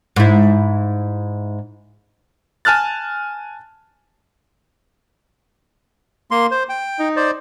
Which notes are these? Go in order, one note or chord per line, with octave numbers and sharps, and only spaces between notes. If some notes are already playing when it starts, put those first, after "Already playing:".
G#2 E4
G#5 A5 F6 F#6 A6
A#3 C6
C5
G5
D#4
C5 D5